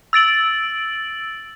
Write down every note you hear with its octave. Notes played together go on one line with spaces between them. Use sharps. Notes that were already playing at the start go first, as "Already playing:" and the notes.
E6 A6 D7 F#7